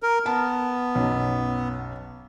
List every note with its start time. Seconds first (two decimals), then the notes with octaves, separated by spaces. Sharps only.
0.03 A#4
0.26 B3 A5
0.95 B1 F#2